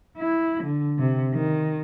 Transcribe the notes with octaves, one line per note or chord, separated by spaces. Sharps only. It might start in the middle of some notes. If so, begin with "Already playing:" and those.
E4
D3
C3
D#3